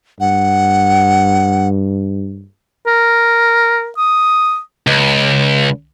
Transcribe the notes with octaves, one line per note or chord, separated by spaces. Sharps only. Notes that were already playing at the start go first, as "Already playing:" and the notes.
G2 F#5
A#4
D#6
C#2